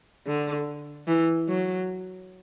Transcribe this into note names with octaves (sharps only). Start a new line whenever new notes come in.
D3
E3
F#3